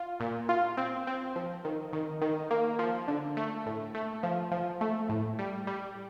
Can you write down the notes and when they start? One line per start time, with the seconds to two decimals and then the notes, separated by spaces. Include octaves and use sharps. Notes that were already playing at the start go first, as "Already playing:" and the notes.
Already playing: F4
0.20 A#2
0.49 F4
0.77 C4
1.07 C4
1.36 F3
1.65 D#3
1.93 D#3
2.22 D#3
2.51 A#3
2.79 F3
3.08 D3
3.37 A3
3.66 A2
3.94 A3
4.23 F3
4.51 F3
4.81 A3
5.09 A2
5.39 G3
5.67 G3